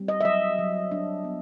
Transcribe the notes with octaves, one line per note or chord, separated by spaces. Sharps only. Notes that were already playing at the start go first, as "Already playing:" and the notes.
Already playing: G3 C4
D#5
E5
F#3 D#5
F#3
D4
B3